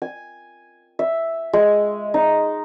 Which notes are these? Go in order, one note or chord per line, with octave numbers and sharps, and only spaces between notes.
G#5
E5
G#3
D#4